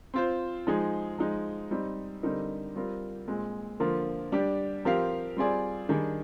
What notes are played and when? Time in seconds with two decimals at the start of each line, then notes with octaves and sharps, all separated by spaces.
0.14 C4 F4 C5
0.67 F3 G#3 D#4 G#4
1.19 F3 G#3 D#4
1.71 G3 C4 D#4
2.23 D3 G3 C4 D#4 A#4
2.76 G3 C4 F4 A#4
3.27 A#2 G#3 C4
3.80 D3 F3 A#3 F4 A#4
4.32 G3 D4 G4 D5
4.85 F3 C4 G4 A#4 F5
5.36 G3 C4 F4 G#4 D5
5.89 D#3 G3 D4 G#4 D5